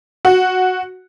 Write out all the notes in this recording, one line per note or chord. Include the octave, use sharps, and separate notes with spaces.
F#4